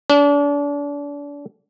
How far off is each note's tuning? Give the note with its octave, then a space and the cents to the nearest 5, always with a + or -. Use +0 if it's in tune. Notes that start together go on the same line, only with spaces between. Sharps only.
D4 -35